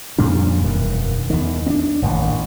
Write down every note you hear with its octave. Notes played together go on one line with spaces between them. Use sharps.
F2 A#2 G3 D4
E1 F#2 D#3
E2 D#3
C4 D4
D#1 A1 D#2